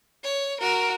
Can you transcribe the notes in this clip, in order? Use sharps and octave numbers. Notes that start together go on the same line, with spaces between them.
C#5
F#4 A#4